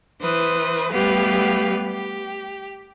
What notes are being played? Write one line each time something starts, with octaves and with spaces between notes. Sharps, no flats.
E3 B4 C5 D#6
G3 A3 B3 G4 B4 F5
G4